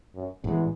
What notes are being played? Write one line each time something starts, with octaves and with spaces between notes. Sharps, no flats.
F#2
A1 E2 A2 E3 G#3